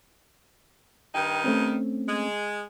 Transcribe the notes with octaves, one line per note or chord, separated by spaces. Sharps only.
G2 D#3 D#4 G5
A3 C4 C#4
G#3